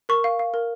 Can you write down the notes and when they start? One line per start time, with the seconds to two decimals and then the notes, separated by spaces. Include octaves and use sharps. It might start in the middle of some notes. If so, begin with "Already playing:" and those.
0.09 A#4 C#6
0.24 F5
0.39 F5
0.54 A#4